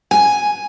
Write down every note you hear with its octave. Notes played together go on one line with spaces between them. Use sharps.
G#5